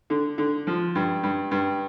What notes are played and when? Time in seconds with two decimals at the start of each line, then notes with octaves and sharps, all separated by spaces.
0.10 D3
0.38 D3
0.67 F3
0.95 G2
1.23 G2
1.51 G2